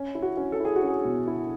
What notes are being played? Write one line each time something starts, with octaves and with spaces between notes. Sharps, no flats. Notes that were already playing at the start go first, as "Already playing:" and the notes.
Already playing: C#4
E4
F#4
C#4
A4
E4 G#4
F#4
C#4
G#4
B2
E4